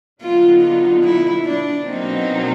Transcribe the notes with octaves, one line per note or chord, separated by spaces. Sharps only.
D3 F#3 B3 D#4 F4
F4
E4
D4
B2 F#3 A#3 C4 D#4